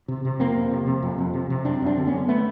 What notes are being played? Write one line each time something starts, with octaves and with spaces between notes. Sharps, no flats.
C3
C3
F2 A#3 C4
F2
C3
C3
F2
F2
C3
C3
F#2 C4 D4
F#2 C4 D4
D3
B3 C#4
D3
A3 B3